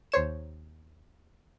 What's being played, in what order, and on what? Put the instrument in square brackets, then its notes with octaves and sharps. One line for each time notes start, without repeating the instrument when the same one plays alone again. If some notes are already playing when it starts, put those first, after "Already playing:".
[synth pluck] D#2 C5 C#5 E7